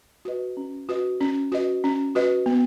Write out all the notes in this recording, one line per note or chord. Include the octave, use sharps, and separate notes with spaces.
F#4 B4 D#5
C#4
F#4 B4 D#5
C#4
F#4 B4 D#5
C#4
F#4 B4 D#5
B3